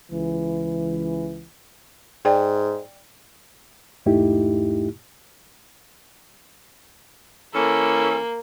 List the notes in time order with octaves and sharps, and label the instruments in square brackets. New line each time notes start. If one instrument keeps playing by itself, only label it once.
[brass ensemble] C#2 E3
[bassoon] G#2 [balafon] D5 G5
[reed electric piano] E2 G#2 A3 D#4 E4 G4
[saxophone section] E3 C#4 A4 [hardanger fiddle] A#3